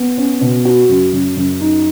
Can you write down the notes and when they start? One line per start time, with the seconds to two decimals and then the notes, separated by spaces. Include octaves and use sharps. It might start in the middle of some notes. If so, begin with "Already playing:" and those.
Already playing: B3
0.17 C#4
0.41 B2
0.65 F#4
0.89 F#2
1.13 F#2
1.37 F#2
1.61 D#4